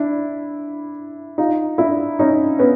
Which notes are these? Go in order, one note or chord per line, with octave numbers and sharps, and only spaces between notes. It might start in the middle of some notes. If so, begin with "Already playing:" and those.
Already playing: D4 E4
D#4 F4
D4 E4
C#4 D#4
B3 C#4